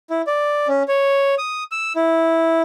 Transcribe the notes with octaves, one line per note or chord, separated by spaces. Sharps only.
E4
D5
C#4
C#5
D#6
E6
E4